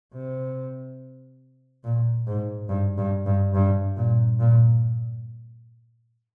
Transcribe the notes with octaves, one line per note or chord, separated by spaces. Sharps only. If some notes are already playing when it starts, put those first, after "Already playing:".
C3
A#2
G#2
G2
G2
G2
G2
A#2
A#2